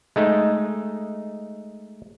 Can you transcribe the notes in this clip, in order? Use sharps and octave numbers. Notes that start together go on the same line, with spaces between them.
G#3 A3 D#4